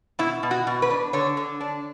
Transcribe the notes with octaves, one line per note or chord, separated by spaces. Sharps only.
B2 E4
B2
F#4
B2
B4
D4
D3 C#5
D3
D4